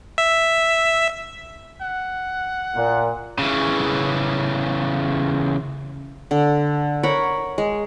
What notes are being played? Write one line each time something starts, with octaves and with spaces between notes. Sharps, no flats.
E5
F#5
A#2
C#3 E3
D3
A#4 C#5 F#5 B5
G#3